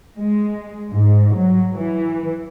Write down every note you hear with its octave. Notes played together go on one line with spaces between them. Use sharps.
G#3
G#2
F#3
E3